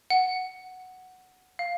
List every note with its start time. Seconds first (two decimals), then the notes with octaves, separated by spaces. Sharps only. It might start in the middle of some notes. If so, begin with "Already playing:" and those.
0.10 F#5
1.59 F5